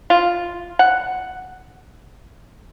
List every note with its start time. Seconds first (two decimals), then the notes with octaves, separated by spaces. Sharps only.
0.10 F4
0.79 F#5